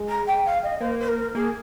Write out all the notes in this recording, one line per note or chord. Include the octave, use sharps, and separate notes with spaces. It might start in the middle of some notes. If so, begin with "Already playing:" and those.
Already playing: G#3
A#5
G5
F5
D#5
A#3 C5
C5
A#4
A#3 G#4